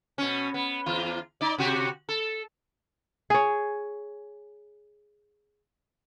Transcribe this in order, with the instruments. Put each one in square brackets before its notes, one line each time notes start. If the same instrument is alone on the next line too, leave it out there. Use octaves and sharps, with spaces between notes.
[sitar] B2 C#4
B3
E2 F4
D#4 D5
C3 F#4 G4
A4
[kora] G#4 C#5